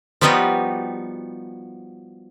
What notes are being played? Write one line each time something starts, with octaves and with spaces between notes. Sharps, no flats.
F3 G3 B3 D#4 F#4 G4